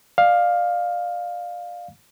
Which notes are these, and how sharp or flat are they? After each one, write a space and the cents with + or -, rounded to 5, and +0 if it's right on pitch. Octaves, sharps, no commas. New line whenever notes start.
D5 +30 F5 +10